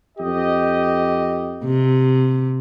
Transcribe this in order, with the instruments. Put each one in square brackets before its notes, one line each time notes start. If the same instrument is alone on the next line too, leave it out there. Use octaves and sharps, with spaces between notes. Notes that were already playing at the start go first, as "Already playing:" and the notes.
[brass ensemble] F2 G4 D#5
[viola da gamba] C3